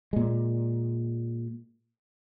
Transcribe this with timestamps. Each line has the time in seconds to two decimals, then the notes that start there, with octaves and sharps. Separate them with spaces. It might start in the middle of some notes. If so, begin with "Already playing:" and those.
0.13 A#2 G#3